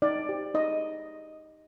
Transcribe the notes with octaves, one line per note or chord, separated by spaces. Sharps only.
D#4 D5
G4 C5
D#4 D#5